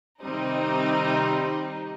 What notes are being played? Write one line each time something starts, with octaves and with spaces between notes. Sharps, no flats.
C3 D#3 G3 C4 D#4